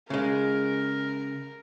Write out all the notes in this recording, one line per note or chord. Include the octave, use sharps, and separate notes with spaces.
C#3 G#3 A#4